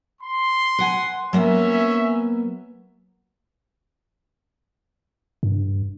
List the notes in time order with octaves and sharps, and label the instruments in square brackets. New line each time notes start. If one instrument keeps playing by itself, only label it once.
[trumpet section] C6
[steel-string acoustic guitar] B4 F#5 G#5
[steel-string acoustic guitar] F#3 A#3 B3 [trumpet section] C#4 E5
[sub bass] G2